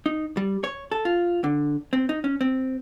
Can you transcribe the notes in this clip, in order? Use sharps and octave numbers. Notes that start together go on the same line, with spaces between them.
D#4
G3
C#5
A4
F4
D3
C4
D#4
C#4
C4